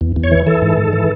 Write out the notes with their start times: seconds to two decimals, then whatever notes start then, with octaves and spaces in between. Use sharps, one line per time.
0.01 E2
0.16 E2
0.24 C#5
0.31 E3
0.46 E3 A4
0.62 G#2
0.77 G#2
0.93 E3